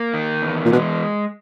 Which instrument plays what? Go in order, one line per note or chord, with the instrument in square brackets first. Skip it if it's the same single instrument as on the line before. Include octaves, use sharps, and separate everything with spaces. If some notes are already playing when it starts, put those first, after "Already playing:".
Already playing: [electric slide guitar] A#3
D#3
E2
[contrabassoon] A#2
[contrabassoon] B2 [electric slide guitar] G#3